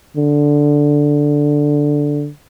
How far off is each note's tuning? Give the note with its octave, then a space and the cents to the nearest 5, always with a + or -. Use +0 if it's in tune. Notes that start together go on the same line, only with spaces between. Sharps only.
D3 +0